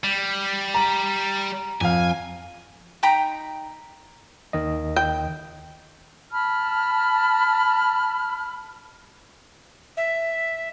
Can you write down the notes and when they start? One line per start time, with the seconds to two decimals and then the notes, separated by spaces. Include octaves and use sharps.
0.04 G3
0.74 A#5 D#7
1.81 F2 F5 G#5
3.03 D#4 G5 A#5 B5
4.53 D#2 D#3 D#5
4.96 G5
6.32 A5 B5 F6
9.97 E5